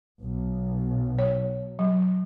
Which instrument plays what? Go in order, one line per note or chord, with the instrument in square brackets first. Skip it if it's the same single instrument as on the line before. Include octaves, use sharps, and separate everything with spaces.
[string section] B1
[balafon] C#5
F#3